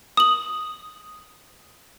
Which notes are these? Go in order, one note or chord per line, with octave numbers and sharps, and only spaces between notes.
D#6 F#7